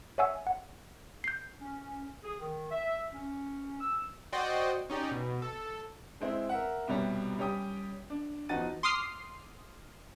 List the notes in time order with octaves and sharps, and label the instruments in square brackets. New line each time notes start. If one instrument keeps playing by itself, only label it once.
[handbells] C#5 E5 F#5 G#5 E6
F#5
G6 C7
[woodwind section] C#4
G#4
D#3
E5
C#4
E6
[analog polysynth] F#4 C5 D5 D#5 G5
C#4 D#4 G4 D5
B2
A4
[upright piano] G#3 C4 E4
A#4 E5 F#5
C2 B2 G3 C#5
G3 C#4 G4 G5 D#6
D4
E2 F3 D#4 F#4 A6 D#7
[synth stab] C6 D6 D#6 F6 C7